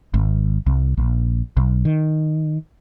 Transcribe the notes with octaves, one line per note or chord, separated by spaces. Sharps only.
G#1
C2
A#1
B1
D#3